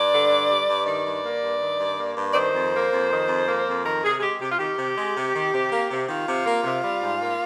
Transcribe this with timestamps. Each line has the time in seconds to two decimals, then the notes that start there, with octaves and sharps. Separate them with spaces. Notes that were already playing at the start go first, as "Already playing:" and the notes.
Already playing: G2 D5
0.12 D3
0.30 G2
0.49 G3
0.67 G2
0.86 D#3 D5
1.04 G2
1.24 A#3
1.42 G2
1.60 D#3
1.80 G2
1.98 A#3
2.17 G2
2.31 D5
2.35 D#3 C5
2.54 F2
2.73 A#3
2.91 F2
3.09 D#3
3.28 F2
3.47 A#3
3.67 F2
3.84 D#3 A#4
4.04 C3 G#4
4.19 G#4
4.21 G#3 G4
4.41 C3 G4
4.51 F4
4.59 D#3 G4
4.77 C3
4.97 G#3
5.15 C3
5.34 D#3
5.53 C3
5.71 A#3
5.90 C3
6.09 D#3 F4
6.28 C3
6.46 A#3
6.64 C3
6.83 G3
7.02 G#2
7.21 A#3